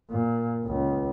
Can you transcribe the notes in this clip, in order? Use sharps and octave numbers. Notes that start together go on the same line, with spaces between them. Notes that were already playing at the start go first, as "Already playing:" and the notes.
A#2
C#2